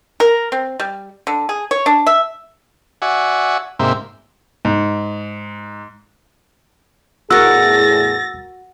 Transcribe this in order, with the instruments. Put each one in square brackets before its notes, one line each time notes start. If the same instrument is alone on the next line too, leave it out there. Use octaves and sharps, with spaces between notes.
[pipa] A#4
C4
G3
D3
G#4
C#5
D4
E5
[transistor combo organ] F#4 D5 E5 F#5 G#5
G#2 C3 A#3 C5 E5
[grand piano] G#2
[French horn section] E2 A2 G#4 [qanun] F#4 A#4 [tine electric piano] E6 [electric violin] A6 A#6